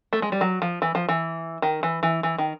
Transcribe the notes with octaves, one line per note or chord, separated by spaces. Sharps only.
A3
G#3
G3
F#3
F3
E3
F3
E3
D#3
E3
E3
E3
D#3